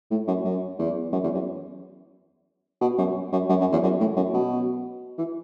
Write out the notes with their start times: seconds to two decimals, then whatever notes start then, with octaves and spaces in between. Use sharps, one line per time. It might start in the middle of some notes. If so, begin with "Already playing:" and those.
0.11 A2
0.27 F#2
0.45 F#2
0.79 E2
1.12 F#2
1.24 E2
1.35 F#2
2.81 B2
2.98 F#2
3.32 F#2
3.49 F#2
3.60 F#2
3.72 E2
3.83 F#2
4.00 A2
4.16 F#2
4.34 B2
5.18 E3